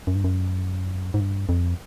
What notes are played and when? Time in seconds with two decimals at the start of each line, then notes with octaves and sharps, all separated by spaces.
0.07 F#2
0.15 G2
0.24 F#2
1.14 G#2
1.20 G2
1.49 F2